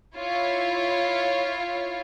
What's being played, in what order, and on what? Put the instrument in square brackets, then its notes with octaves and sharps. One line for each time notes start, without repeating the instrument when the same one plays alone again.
[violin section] E4 F4 C#5